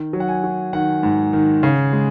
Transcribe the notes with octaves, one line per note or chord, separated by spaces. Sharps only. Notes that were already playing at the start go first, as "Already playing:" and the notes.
Already playing: D#3
F#3
F#5
G#5
F#3
D#3 F#5
G#2
D#3
C#3
G#3